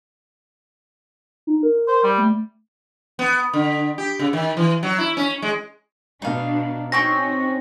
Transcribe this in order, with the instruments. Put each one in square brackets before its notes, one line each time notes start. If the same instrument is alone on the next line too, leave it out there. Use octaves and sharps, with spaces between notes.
[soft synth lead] D#4
A#4
[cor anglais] C5
G3
[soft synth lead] A3
[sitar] B3
D3
G4
C#3
D#3
E3
F#3
E4
C#4
G#3
[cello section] B2 D4 [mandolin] D#4 F5
[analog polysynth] C4 C#4 [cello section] D#4 F#4 [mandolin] G5 C#6 G6 [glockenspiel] A#6